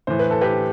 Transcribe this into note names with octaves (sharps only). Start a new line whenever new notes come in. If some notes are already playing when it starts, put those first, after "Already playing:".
A2 E3 C5
B4
A4
G4 B4